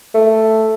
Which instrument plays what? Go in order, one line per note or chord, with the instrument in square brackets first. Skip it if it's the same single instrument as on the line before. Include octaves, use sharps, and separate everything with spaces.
[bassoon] A3